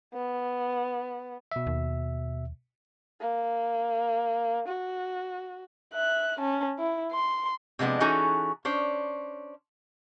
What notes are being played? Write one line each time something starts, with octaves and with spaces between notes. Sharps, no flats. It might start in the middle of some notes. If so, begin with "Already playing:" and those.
B3
B2 E5
D#2
A#3
F#4
E5 F#6
C#4 A5
E4
C6
C3 F3 G#3 B3 D4
E3 C#4 D#4 F#4 G#4 A4
C#4 D4 C5